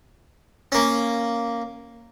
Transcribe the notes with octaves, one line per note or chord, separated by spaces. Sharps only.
A#3 C#4